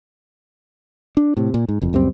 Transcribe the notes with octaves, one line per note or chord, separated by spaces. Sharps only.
D4
A2 C3
A#2
G#2
F#1 F2
C#2 F#2 G3 C4